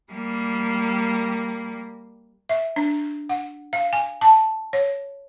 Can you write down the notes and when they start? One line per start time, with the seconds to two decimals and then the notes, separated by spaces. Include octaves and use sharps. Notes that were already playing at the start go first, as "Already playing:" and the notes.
0.13 G3 A#3
2.49 E5
2.76 D4
3.29 F#5
3.73 F5
3.93 G#5
4.21 A5
4.73 C#5